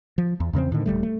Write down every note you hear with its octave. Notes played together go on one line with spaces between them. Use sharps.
F3
E2
E2 C#3 B3 C4
A2 D3 D#3
D#1 B1 G3 A3
A3